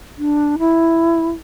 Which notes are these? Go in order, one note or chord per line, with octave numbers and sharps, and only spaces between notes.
D4
E4